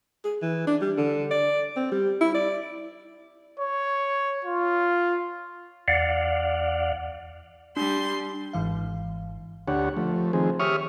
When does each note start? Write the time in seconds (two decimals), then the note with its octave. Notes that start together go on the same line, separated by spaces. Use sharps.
0.24 G#4
0.42 E3
0.67 D4
0.81 G3
0.97 D3
1.31 D5
1.76 C4
1.92 G3
2.21 E4
2.34 D5
3.60 C#5
4.45 F4
5.88 E2 D5 F5 F#5
7.77 G3 D4 C6
8.53 G#1 G#2 E3 F5
9.68 D2 D4 G4 C#5 F#5
9.97 F3 A3
10.33 D#3 F3 C4 G#4
10.60 G4 C#5 E5 C#6 D#6 F6